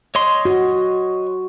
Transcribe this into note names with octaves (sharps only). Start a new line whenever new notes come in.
C#5 D#5 C6
F#4